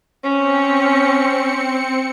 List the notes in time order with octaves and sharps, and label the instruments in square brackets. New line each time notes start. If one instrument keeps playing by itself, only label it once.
[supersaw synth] C4 C#7 [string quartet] C#4